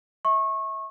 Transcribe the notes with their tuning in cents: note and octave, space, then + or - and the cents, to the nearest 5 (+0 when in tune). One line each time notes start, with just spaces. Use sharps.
E5 -30 C#6 -25